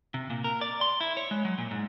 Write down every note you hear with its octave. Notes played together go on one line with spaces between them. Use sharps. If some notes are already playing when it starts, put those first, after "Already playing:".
C3
A#2
A#4
D5
C6
E4
C#5
G#3
F#3
A#2
G#2